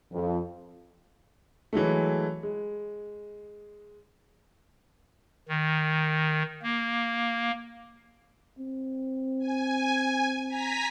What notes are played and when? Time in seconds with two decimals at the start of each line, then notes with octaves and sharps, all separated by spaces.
0.12 F2
1.73 E3 F#3 G#3 A3
2.43 G#3
5.49 D#3
6.62 A#3
8.59 C4
9.38 G#5
10.48 G#5 A#5 B6